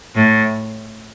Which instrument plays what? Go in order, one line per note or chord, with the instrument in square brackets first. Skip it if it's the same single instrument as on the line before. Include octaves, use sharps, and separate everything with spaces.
[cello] A2